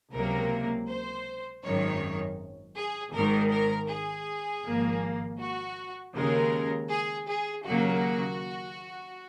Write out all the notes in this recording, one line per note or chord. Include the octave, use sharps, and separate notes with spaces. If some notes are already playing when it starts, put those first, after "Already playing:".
C#2 C3 F#3 A#3 A#4
C5
G#1 F#2 D#3 C#5
G#4
G#1 G#2 D#3 A#4
A#4
G#4
G#1 G#2 F3 A#3
F#4
D#2 C#3 G#3 A#4
G#4
G#4
D#2 C#3 F#3 A#3 F#4